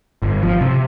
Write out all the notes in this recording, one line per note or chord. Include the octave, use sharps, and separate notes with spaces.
G1
F3
C3